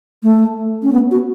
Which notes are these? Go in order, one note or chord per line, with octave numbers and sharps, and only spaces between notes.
A3
C#4
B3
F#4